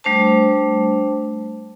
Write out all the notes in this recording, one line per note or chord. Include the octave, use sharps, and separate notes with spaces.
G3 A3 D4 C5 A5